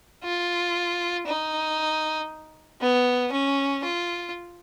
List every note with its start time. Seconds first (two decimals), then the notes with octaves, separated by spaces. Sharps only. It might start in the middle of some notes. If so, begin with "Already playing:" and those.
0.24 F4
1.27 D#4
2.81 B3
3.32 C#4
3.84 F4